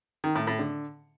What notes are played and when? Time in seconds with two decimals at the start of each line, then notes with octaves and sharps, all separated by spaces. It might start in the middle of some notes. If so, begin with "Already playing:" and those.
0.24 D#3
0.36 A2
0.47 A2
0.59 D3